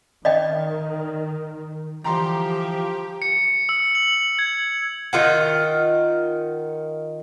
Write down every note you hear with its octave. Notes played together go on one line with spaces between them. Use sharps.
D#3 D5 D#5 G5
D3 E3 F3 G3 G4 A#5 C6
C#7
E6
F#7
G#6
D#3 F4 F#5